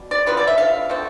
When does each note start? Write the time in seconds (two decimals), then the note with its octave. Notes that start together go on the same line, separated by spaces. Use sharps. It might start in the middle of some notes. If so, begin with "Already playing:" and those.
Already playing: B2 G3
0.11 D5
0.26 D3 F3 C4 B4
0.37 D5
0.48 E5
0.58 F5
0.89 D3 A3 C4